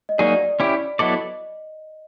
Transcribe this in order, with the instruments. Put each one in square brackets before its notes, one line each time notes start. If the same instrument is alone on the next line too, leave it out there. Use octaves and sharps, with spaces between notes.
[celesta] D#5
[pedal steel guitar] F#3 A#3 D#4 G#4 [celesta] D5
[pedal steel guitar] C#4 E4 G4
[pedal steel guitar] F#3 B3 E4 A4 D5 [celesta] D#5